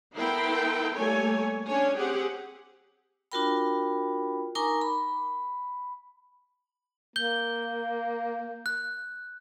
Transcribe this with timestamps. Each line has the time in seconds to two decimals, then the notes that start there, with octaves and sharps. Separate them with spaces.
0.16 B3 E4 A4 A#4 G5 C6
0.95 G3 A3 A#3 A4 C#5 G#5
1.67 C#4 D4 C#5 G#5
1.96 C4 G4 G#4 F#5
3.32 D4 F4 F#4 A#4 G5 B5
4.55 D#4 A#4 G#5 A#5 C#6 D6
4.81 B5
7.16 A#3 G6 G7
8.66 F#6